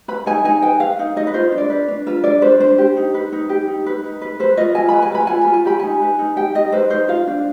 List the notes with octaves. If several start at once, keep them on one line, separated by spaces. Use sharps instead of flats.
B4 B5
D#4 G#5
D#4 G#5
B4 G5
B4 F5
D#4
D#4 D#5
B4
F4 C5
D4
D5
B4
D4
F4 B4
D4 D5
B4 C5
D4 C5
G4
D#4
B4
D#4
G4
D#4
B4
D#4
B4
B4 C5
F4 D#5
F4 G#5
B5
B4
G#5
B4 B5
F4 G#5
B5
F4
G#5
G4 B5
D#4 G#5
B4
D#4
G4 G5
D#4 D#5
B4 C5
D#4 C5
F4 F5
D4